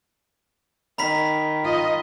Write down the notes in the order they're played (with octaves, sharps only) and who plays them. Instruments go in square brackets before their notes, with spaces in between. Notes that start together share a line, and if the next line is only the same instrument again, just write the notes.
[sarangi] D#3 [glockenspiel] A#5 B5 B6
[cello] F4 D#5